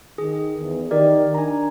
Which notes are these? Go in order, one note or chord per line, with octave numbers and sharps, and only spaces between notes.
D#3 G#4
E2
D#3 G4 A#4 D5
D4 G#5 A#5